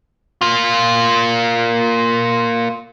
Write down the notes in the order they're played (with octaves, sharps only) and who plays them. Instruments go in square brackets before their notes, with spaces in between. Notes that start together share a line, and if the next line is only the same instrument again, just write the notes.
[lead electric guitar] A#3 F4